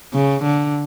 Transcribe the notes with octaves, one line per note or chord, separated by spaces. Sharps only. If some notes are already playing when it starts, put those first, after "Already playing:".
C#3
D3